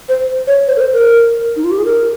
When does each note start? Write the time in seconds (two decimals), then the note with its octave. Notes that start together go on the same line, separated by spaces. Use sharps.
0.09 C5
0.47 C#5
0.68 C5
0.76 A#4
0.81 C5
0.93 A#4
1.56 D#4
1.64 F4
1.71 G4
1.78 G#4
1.85 A#4